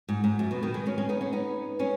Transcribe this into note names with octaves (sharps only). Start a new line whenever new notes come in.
G#2
G#2
F#2
B2
B2 D#3
D#3 G#3
G#3 C#4
G#3 C#4
B3 D#4
G#3 C#4
B3 D#4
G#3 C#4